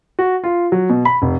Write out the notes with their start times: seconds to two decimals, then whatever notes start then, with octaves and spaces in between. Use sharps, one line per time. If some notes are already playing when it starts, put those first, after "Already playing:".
0.19 F#4
0.44 F4
0.72 F#3
0.90 B2
1.05 B5
1.22 F1